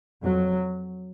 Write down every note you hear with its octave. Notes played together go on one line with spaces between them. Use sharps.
F2 F#3